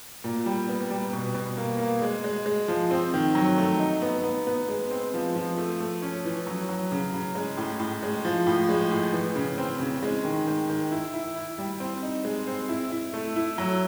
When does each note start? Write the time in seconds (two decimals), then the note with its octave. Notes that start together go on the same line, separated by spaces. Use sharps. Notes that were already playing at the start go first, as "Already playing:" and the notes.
0.24 A#2
0.46 G3
0.69 B3
0.90 G3
1.13 B2
1.35 B2
1.57 A#3
1.79 A#3
2.02 G#3
2.24 G#3
2.46 G#3
2.68 F3
2.91 C4
3.14 D#3
3.35 F#3
3.58 A3
3.80 D#4
4.02 B3
4.24 B3
4.47 B3
4.69 G#3
4.91 C4
5.14 F3
5.36 F3
5.58 A3
5.80 A3
6.02 C#4
6.25 E3
6.47 F#3
6.69 F#3
6.92 C#3
7.14 C#3
7.35 G#3
7.57 A2
7.80 A2
8.03 G#3
8.25 F3
8.47 A2
8.69 G#3
8.91 A2
9.13 E3
9.36 C#3
9.58 C4
9.80 C#3
10.03 G#3
10.25 D#3
10.47 D#3
10.70 D#3
10.91 E4
11.14 E4
11.36 E4
11.58 G3
11.80 C4
12.03 D#4
12.25 G#3
12.47 C4
12.69 E4
12.92 E4
13.13 A3
13.36 E4
13.58 F#3